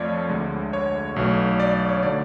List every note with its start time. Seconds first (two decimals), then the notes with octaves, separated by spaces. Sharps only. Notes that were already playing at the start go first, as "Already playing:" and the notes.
Already playing: F2 F3 A3 C#5 D5
0.30 D2 D3 G#3
0.73 C#5
1.16 B1 B2 A3
1.60 D5
1.74 D5
1.89 C#5
2.03 D3 F#3 A3 D5